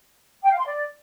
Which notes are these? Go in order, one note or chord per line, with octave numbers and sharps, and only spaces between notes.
G5
F5
C6
D5